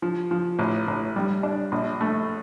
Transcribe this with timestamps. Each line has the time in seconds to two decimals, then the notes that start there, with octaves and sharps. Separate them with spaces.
0.02 F3
0.31 F3
0.59 A1
0.88 A1
1.16 G3
1.43 D4
1.72 A#1
2.01 A3